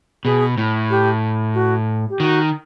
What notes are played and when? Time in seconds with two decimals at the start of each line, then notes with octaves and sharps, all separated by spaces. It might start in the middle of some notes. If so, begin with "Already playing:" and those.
0.25 B2 G#4
0.57 A2
0.90 G4
1.55 F#4
2.10 G4
2.20 D#3 F#4